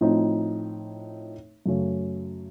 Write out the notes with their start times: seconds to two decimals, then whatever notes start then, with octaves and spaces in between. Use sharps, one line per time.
0.01 A2 F3 C4 D#4
1.66 F#2 C#3 F#3 A3 C#4